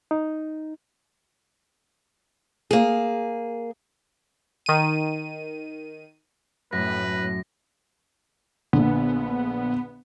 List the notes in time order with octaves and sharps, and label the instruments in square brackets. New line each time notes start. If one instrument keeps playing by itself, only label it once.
[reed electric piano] D#4
[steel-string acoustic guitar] A#3 G#4
[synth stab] D#3 D#7
[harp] F#2 [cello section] A2 [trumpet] B4 [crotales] A#6
[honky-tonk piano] A#1 D3 [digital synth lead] B3